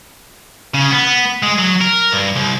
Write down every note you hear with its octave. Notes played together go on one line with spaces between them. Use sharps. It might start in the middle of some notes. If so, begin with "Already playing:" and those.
C#3
B3
G#3
F#3
A#4
G2
C2